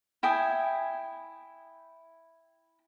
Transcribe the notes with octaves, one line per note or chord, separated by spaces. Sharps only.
E4 G5 G#5 D#6